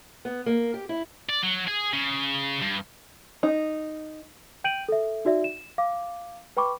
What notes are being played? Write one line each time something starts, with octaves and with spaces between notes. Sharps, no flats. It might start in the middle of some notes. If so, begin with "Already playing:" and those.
B3
A#3
G4
E4
D5
F#3
G#4
C#3
G2
D#4
G5 G6 D7 D#7 F#7
A4 E5
D#4 F#4 D5 E5
E7
F5 D6
B4 G5 B5 C#6 D6